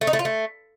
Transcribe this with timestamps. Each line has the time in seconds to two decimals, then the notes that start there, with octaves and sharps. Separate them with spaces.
0.01 A3
0.07 D#4
0.13 A3
0.19 F4
0.25 A3